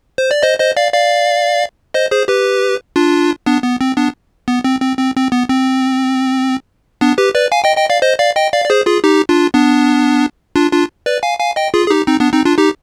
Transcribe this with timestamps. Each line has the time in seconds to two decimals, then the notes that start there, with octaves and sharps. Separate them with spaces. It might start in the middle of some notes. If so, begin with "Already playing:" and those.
0.18 C5
0.31 D5
0.43 C5 D#5
0.59 C5 D#5
0.77 D5 F5
0.93 D5 F5
1.94 C5 D#5
2.11 G#4 C5
2.28 G4 B4
2.96 D4 F4
3.46 B3 D4
3.64 B3
3.81 C4
3.97 B3 D4
4.48 B3
4.64 C4
4.81 C4
4.99 C4
5.16 C4
5.32 B3
5.49 C4
7.01 B3 D4
7.18 G4 B4
7.35 B4 D5
7.52 F5 G#5
7.64 D#5 G5
7.77 D#5 G5
7.90 D5 F5
8.02 C5 D#5
8.19 D5 F5
8.36 D#5 G5
8.53 D5 F5
8.65 D5
8.70 G#4 C5
8.86 F4 G#4
9.04 D#4 G4
9.29 D4 F4
9.54 B3 D4
10.56 D4 F4
10.72 D4 F4
11.06 B4 D5
11.23 F5 G#5
11.39 F5 G#5
11.56 D#5 G5
11.74 F4 G#4
11.87 G#4
11.90 D#4 G4
12.07 C4 D#4
12.20 B3 D4
12.33 C4 D#4
12.45 D4 F4
12.58 D#4 G4